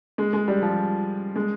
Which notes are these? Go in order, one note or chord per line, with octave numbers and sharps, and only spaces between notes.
G#3
G#3
G3
F3
G#3